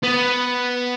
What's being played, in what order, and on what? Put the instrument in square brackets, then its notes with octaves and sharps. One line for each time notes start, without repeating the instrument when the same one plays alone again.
[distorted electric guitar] B3